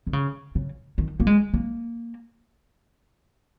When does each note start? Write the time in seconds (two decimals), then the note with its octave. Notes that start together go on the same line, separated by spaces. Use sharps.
0.07 D#3
0.13 C#3
0.55 C#3
0.98 D#3
1.20 A#3
1.27 G#3
1.54 A#3